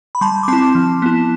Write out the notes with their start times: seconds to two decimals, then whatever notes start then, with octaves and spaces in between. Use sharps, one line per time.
0.15 B5
0.21 G3 A5 C6
0.43 D6
0.48 C4 E4 A5 C6
0.75 F3
1.02 B3 E4